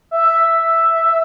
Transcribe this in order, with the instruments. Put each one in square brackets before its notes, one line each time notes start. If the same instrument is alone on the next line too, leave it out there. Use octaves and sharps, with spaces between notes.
[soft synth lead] E5